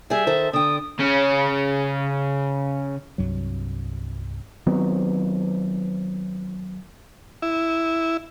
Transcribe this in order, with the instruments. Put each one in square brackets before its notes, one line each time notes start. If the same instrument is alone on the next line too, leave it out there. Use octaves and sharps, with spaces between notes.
[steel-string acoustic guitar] G3 G#4 [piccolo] E5
[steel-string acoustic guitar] D#3 A4 C5
[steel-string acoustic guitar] D3 G5 [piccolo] D#6
[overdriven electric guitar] C#3 C#4
[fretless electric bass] C2 G2 F#3
[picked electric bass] D#3 F#3 B3 C4
[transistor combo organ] E4